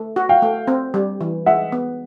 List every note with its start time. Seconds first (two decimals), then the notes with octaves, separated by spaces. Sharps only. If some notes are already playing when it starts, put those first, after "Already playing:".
Already playing: A3
0.16 F#4
0.29 F5 G5
0.42 A3
0.68 C4
0.94 G3
1.21 E3
1.46 G#3 E5 F#5
1.72 B3